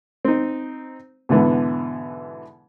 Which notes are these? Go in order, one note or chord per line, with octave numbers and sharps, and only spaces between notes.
C4 D#4
G#2 B2 D3 E3 B3